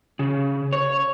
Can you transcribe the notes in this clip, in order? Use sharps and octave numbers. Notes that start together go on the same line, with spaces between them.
C#3
C#5